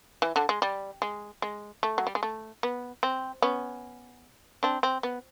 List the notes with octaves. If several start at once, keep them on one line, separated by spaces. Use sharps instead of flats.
E3
D3
G#3
G3
G#3
G#3
A3
F#3
G3
G#3
A3
B3
C4
B3 C#4
C4 D4
C4
B3